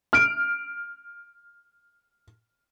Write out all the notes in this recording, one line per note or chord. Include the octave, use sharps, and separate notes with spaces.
F6 D7